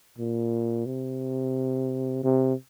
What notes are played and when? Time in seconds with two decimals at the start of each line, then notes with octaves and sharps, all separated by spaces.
0.18 A#2
0.86 C3
2.24 C3